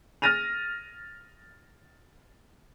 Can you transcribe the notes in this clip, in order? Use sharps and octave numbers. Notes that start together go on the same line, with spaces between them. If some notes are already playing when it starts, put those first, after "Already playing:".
F6 A6 A#6 D#7 F7